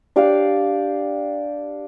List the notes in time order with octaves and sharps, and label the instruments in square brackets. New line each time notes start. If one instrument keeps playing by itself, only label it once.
[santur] D4 G4 D5 F5